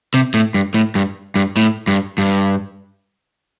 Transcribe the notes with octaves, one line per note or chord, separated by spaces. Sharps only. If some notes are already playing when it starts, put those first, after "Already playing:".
C3
A2
G2
A2
G2
G2
A2
G2
G2